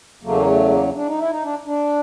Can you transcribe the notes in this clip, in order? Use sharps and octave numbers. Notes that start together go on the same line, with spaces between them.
E2 C#3 F#3 A3 A#3
A3
A#3
D4
D#4
E4
D#4
D4
D4